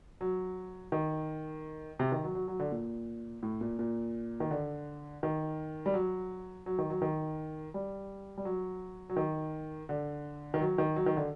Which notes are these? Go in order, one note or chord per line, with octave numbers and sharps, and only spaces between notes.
F#3
D#3
C3
D#3
F#3
F#3
F#3
D3
A#2
A2
A#2
A#2
D#3
D3
D#3
G3
F#3
F#3
D#3
F#3
D#3
G3
G3
F#3
F#3
D#3
D3
D#3
F#3
D#3
F#3
D#3
D3